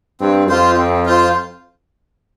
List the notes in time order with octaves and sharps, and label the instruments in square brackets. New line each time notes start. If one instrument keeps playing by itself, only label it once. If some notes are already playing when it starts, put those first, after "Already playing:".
[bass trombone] G2 [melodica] C4
[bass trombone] F2 [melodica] F4 C5
[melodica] C4
F4 C5